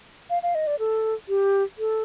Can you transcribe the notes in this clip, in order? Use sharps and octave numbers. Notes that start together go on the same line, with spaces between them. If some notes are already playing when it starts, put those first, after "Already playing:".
F5
F5
D#5
D5
A4
G4
A4